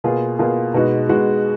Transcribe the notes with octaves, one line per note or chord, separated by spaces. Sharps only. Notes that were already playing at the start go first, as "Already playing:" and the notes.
B2 A#3 F4 G#4
B2 A#3 F4 G#4
B2 G#3 D#4 F#4
B2 G#3 D#4 F#4